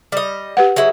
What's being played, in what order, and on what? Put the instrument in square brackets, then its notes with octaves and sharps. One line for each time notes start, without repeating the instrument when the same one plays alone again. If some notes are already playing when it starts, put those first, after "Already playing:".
[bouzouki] G3 D#5
[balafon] G4 B4 F#5
[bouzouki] F#3 G#3 E4